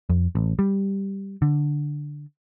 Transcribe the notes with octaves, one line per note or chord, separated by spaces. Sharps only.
F2
A1
G3
D3